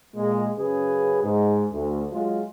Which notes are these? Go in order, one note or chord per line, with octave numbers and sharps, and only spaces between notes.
A#2 G#3
F#2 C#3 G#4 B4
G#2
D2
F#3 G#3 F4